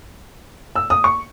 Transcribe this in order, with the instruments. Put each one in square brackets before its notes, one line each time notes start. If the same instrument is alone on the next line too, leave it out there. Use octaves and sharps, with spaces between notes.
[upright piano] E6
D#6
C#6